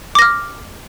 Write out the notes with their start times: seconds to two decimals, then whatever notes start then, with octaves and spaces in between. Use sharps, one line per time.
0.15 D6
0.19 A#6
0.22 F6